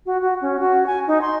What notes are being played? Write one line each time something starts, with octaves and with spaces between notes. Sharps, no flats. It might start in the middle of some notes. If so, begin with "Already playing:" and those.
F#4
F#4
C#4
F#4
G#5
D#4
C6